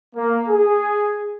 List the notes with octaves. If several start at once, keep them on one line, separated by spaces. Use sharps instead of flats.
A#3
G#4